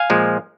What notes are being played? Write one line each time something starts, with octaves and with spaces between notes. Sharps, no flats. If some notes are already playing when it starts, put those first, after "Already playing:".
Already playing: F5 G#5
A#2 F3 G#3